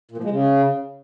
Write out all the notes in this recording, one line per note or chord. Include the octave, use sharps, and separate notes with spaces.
A#2
F3
G#3
C#3